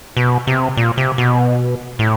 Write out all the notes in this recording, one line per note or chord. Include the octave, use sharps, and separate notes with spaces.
B2
C3
A#2
C3
B2
A2